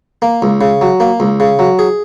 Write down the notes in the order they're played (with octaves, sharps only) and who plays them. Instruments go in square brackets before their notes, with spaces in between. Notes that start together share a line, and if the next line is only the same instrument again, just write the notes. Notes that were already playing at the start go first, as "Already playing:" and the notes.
[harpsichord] A#3
C#2
C#3
F#3
A#3
C#2
C#3
F#3
G#4